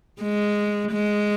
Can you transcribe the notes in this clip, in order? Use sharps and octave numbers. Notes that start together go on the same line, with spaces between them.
G#3
G#3